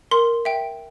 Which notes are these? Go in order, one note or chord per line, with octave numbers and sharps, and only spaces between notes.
A#4 C6
E5 G5